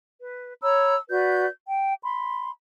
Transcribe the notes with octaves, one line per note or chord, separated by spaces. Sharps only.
B4
C#5 A#5 B5 E6
F#4 B4 D5 G6
G5
B5 C6